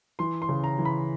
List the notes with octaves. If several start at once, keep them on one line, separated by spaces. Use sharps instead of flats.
E3 C6
C6
C#3
A#5
E3
B5